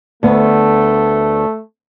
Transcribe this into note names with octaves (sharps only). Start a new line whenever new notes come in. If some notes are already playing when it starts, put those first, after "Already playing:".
D2 A3 B3